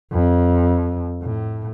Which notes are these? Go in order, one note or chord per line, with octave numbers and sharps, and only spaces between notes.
F2
A2